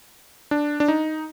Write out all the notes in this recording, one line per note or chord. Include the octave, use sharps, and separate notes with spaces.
D4
D4
D#4